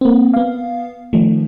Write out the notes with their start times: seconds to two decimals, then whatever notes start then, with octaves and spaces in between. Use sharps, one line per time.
0.01 A#3 C4
0.34 B3 F5
1.13 D#3 F3 A3